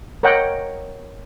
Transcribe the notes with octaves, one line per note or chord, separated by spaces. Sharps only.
A#4 C#5 D#5 F#5 G5